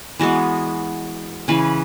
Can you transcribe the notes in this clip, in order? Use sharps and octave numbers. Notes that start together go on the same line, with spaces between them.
E3 G#3 B3 F#4
C#3 E3 C#4 B4